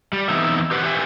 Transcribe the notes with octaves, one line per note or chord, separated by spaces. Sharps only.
G3
E3 B3 C4 D#4 E5
G4 B4 C5 F#5
G4 B4 C5 E5 G#5